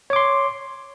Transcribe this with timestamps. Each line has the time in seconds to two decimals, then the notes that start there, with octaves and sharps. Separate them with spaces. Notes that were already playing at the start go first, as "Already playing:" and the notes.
0.10 C#5
0.13 D6
0.16 C6